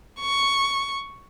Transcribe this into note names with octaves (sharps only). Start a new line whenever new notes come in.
C#6